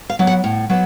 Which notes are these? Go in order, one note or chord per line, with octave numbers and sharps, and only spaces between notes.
F5
F#3 B3
F#5
A2
F#3 B3